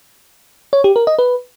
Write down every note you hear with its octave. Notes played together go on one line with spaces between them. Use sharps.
C#5
G4
A#4
D#5
B4